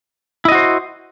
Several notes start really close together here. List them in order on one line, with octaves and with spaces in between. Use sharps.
E4 D#5 F#4 C5